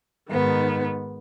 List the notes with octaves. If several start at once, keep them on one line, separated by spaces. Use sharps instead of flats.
G#2 D#3 B3